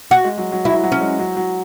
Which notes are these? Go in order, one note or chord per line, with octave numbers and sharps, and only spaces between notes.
F#4
G#3
F#3
F#3
F#3 E4
F#3
C#4
G#3
F#3
F#3